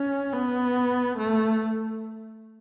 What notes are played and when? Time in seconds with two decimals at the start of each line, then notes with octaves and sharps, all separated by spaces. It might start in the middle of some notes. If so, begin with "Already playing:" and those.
Already playing: C#4
0.32 B3
1.18 A3